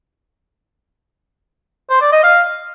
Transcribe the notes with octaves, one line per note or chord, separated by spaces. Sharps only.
C5
D5
D#5
F5